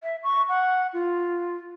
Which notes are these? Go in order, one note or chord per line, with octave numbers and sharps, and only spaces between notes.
E5
C#6
F#5
F4